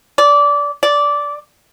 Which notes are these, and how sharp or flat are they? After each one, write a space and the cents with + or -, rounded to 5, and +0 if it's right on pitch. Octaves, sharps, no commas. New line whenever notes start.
D5 -20
D5 -15